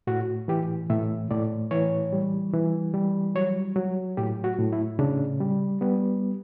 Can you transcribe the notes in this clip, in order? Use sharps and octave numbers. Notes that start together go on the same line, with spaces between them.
A2 F#4
E3 G4
A2 E5
A2 D5
E3 C#5
G3
E3
G3
F#3 C#5
F#3
A2 G4
F#4
A2
E4
C#3 D4
G3
G3 B3